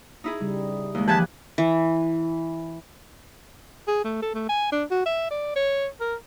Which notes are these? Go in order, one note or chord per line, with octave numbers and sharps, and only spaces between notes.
D#4 E4 G#4
C#3 G3
D#2 G#3
E3 F3 G#3 G4 B4 G#5 A5 F#6
E3
G#4
A3
A4
A3
G#5
D4
F#4
E5
D5
C#5
A#4